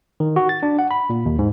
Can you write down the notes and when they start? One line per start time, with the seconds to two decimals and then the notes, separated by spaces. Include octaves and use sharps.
0.20 D#3
0.36 F#4
0.49 A6
0.63 D4
0.79 F#5
0.91 B5
1.10 A#2
1.25 D#2
1.39 G#2